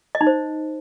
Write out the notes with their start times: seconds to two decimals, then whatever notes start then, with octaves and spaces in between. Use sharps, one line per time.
0.15 D#5
0.21 D#4
0.27 C5